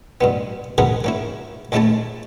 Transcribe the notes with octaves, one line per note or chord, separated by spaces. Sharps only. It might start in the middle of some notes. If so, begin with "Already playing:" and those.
G2 B2 B3
G#2 B2 G#4 A#4 B4 F#5
A#3 C#4 E4
D#2 G#3 A3 C#4 E4 A5